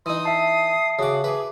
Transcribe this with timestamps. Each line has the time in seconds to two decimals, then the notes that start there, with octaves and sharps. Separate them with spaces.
0.06 E3 D#4 C6 D#6
0.25 E5 A5 C7
0.99 C#3 F#4 D6 D#6
1.24 G#4 B4 D6